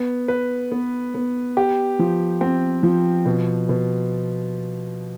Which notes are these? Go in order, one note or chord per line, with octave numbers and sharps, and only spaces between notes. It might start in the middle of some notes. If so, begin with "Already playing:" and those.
Already playing: B3
B4
B3
B3
G4
F3
C4
F3
B2
B2